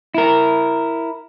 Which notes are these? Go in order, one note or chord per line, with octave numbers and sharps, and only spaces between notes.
E4 A#4